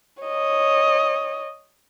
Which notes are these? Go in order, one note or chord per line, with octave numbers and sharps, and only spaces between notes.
C#5 D#5